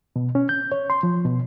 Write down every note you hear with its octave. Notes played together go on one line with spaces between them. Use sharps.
B2
C#4
G6
C#5
C6
F3
B2